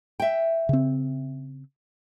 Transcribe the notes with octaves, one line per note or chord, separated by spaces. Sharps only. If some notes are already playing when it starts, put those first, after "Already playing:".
E5 G5
C#3 C4